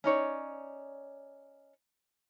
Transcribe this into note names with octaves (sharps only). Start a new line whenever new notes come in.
C#4 D#4 C#5 D5